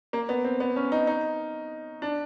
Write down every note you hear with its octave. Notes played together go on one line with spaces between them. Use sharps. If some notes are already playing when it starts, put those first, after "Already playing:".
A#3
B3
C4
B3
C#4
D#4
D#4
D4